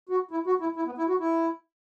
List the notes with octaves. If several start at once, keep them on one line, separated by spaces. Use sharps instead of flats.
F#4
E4
F#4
E4
E4
B3
E4
F#4
E4